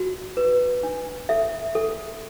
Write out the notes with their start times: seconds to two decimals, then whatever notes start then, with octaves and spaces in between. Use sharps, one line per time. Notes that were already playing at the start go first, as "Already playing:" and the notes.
Already playing: F#4
0.37 B4
0.83 D4
1.29 A4 E5
1.75 A4